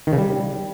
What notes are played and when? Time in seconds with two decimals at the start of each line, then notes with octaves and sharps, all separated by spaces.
0.07 D#3
0.13 C#3
0.18 G3